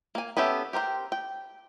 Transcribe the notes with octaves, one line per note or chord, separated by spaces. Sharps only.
A#3 G#5
B3 C#4 G4 A4 E5
G4 A#4 C5 G5
G5